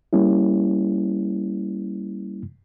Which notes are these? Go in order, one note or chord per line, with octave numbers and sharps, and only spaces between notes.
G3 A#3 C#4 E4